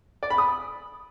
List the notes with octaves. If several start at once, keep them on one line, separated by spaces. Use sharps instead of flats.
D5
B5
D#6